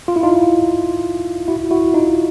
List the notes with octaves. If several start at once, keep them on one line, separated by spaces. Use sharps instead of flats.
F4
E4
D#4 F4
E4 F#4
E4 F#4
D#4 F4